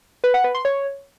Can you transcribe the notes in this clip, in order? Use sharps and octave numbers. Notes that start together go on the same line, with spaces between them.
B4
F#5
B4
C6
C#5